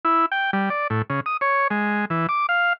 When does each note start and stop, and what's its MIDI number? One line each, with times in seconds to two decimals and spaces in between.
0.05 0.26 64
0.32 0.51 79
0.53 0.69 55
0.70 0.87 74
0.90 1.02 45
1.10 1.20 49
1.26 1.37 87
1.41 1.68 73
1.70 2.05 56
2.10 2.27 52
2.29 2.46 86
2.49 2.73 77